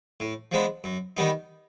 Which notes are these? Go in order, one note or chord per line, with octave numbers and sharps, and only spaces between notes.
A2
F3 G#3 B3 D4
F#2
D#3 G3 B3 D#4